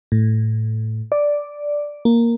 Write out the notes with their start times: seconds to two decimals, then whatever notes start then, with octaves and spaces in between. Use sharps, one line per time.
0.12 A2
1.12 D5
2.05 A#3